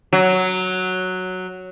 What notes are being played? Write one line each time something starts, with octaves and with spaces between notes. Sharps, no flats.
F#3